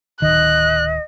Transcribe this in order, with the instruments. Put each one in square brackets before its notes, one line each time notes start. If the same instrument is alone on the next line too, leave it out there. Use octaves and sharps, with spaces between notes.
[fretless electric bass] D1 D#3 [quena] D#5 [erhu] F#6